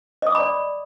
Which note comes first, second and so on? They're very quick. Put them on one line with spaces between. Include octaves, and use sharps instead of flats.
D#5 D#6 D6 B5 D5